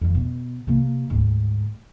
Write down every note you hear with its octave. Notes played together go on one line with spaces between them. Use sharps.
F2 D#3
B2
C3 A#3
D2 G#2